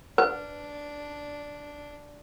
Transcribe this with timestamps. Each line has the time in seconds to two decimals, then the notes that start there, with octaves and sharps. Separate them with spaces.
0.18 D4 B4